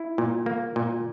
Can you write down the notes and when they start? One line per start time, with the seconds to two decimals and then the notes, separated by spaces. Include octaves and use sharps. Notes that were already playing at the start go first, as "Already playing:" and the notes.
Already playing: E4
0.18 A#2
0.46 A#3
0.76 A#2